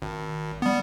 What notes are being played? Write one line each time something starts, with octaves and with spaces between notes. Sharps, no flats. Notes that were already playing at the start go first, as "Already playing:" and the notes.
G#1
G3 B3